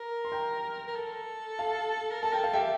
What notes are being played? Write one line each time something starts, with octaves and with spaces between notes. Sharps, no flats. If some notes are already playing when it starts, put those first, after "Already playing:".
Already playing: A#4 A#5
C6
G5 A#5
A#4
A4
F5 A5
A#4
A4 A5
A#4 G5
A4
F5
G4 E5 G5